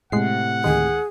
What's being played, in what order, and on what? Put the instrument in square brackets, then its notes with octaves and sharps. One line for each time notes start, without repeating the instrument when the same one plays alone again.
[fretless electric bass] A2 C3 [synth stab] G#3 C7 [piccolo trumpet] F#5
[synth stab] D2 D#3 G#3 [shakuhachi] G#4